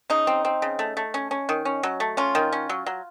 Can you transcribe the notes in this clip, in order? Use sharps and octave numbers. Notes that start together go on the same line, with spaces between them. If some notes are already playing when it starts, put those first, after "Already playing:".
C#3 D#4
C4
C4
C#3
A3
A3
C#4
C#4
D#3
C#4
F#3
A3
C#4 F4
D#3
C#4
F#3
F#3